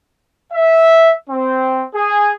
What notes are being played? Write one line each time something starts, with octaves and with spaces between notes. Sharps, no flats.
E5
C4
G#4